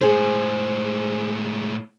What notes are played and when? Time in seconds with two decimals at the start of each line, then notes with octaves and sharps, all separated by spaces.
0.01 A2 G#3 G#4 C5